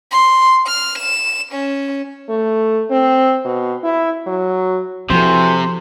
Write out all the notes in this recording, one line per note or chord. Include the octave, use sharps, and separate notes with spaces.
C6
F6
E7
C#4
A3
C4
B2
E4
F#3
C3 E3 F3 F#4 A4 C5